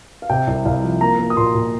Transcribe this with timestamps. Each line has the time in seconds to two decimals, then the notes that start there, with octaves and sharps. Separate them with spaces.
0.22 F5
0.30 C3 G5
0.47 C2
0.65 C2 F5
0.83 F3
1.01 A#3 A#5
1.19 A#3
1.30 D#6
1.37 A#2 C6
1.54 A#2